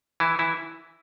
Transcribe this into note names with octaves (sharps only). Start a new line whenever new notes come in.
E3 E4
E3 E4